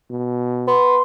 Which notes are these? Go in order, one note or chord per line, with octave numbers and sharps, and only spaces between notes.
B2
B3 C6